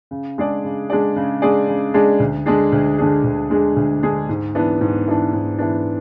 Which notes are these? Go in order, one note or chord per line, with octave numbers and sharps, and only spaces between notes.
C#3
G#3 D4 G#4 D5
C#3
G#3 D4 G#4 D5
C#3
G#3 D4 G#4 D5
C#3
G#3 D4 G#4 D5
D2
D3 G#3 D4 G#4
D2
D3 G#3 D4 G#4
D2
D3 G#3 D4 G#4
D2
D3 G#3 D4 G#4
G#2
E3 B3 D4
G#2
E3 B3 D4
G#2
E3 B3 D4